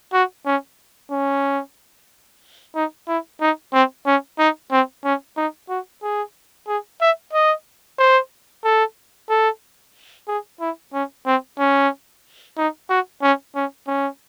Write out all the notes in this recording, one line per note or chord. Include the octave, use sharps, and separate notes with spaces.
F#4
C#4
C#4
D#4
E4
D#4
C4
C#4
D#4
C4
C#4
D#4
F#4
G#4
G#4
E5
D#5
C5
A4
A4
G#4
E4
C#4
C4
C#4
D#4
F#4
C#4
C#4
C#4